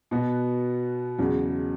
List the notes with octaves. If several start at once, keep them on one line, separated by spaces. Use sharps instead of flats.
B2 B3 F#4
E2 C#3 F#3